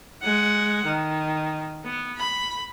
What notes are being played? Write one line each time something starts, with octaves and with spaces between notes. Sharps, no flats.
G#3 F#5
D#3
B3
B5